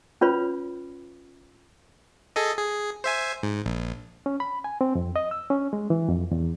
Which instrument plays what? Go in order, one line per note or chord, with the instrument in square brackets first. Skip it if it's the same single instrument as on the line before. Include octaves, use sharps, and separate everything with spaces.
[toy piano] C#4 F4 B4 C#5 B5
[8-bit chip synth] G#4 A4 D#5
G#4
C5 E5 G#5
G#2
A#1
[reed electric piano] C#4
B5
G#5
C4
F2
D#5
E6
C#4
G#3
E3
F2
E2